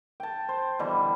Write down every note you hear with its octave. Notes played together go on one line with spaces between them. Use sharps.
G5 A5
C5
B2 D3 E3 G3